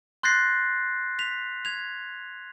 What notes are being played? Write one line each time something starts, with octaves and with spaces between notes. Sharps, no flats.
C6 F#6 G6 A6 A#6 C7
B6 F7
G#6 F7